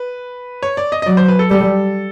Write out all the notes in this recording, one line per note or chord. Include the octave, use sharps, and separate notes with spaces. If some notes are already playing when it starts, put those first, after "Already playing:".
Already playing: B4
C#5
D5
D#5
D#5
F#3 D5
C5
B4
A4
G3 A4